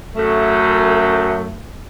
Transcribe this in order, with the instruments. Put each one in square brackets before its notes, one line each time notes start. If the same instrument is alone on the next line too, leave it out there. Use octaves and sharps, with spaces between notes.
[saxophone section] F#2 A3